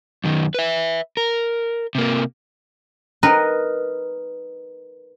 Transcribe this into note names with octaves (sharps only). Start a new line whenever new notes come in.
F#2 D#3
B4 E5
A#4
C3 A#3
D#4 A#4 B4